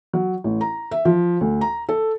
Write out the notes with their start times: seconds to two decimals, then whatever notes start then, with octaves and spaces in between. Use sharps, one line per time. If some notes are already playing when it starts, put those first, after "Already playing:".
0.13 F#3
0.44 A1
0.61 A#5
0.91 E5
1.05 F3
1.41 D2
1.61 A#5
1.89 A4